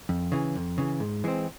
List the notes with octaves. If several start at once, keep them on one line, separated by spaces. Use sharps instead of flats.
F2
C#3 E3
F2
C#3 E3
G#2
E3 G#3 C4